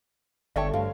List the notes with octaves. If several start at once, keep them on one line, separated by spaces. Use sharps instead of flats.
G1 G4 A4 C#5 D5 E5 G5
D2 G2 F5